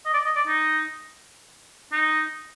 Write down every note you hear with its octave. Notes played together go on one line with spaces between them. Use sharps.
D#5
D5
D#5
D5
D#4
D#4